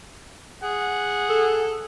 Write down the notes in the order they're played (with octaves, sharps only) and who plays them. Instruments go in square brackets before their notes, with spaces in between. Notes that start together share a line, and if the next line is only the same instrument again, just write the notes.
[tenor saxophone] G#4 [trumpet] F#5
[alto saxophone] A4